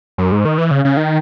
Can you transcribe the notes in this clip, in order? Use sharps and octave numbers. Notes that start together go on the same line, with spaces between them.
F#2
G#2
D#3
E3
C#3
C#3
D#3